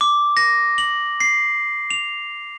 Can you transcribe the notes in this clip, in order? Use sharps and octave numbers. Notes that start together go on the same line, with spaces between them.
D6
A#6
F#7
C7
F7